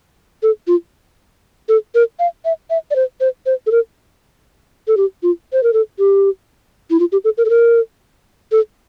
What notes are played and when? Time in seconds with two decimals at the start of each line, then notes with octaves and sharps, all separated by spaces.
0.43 A4
0.67 F4
1.69 A4
1.95 A#4
2.19 F5
2.45 E5
2.70 E5
2.91 D5
2.96 C5
3.20 C5
3.46 C5
3.66 A4
3.71 A#4
4.88 A4
4.97 G4
5.23 F4
5.53 C5
5.63 A#4
5.73 A4
5.99 G4
6.90 E4
7.00 F4
7.12 G4
7.24 A4
7.38 A#4
7.45 A4
7.50 A#4
8.52 A4